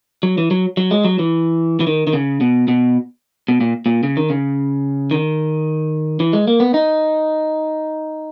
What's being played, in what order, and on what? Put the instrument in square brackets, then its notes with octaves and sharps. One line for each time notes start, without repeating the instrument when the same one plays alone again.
[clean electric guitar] F#3
E3
F#3
F#3
G#3
F#3
E3
E3
D#3
D#3
C#3
B2
B2
B2
A#2
A#2
C#3
D#3
C#3
D#3
E3
G#3
A#3
B3
D#4